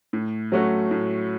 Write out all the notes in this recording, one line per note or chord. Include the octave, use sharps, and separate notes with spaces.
A2
F#3 A3 C#4 F#4
A2